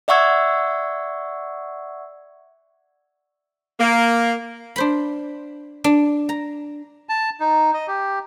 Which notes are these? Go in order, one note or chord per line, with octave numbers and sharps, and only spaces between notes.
D5 E5 F#5 C#6 E6 G#6
A#3
D4 C5 B5
D4
A#5
A5
D#4
D#5
G4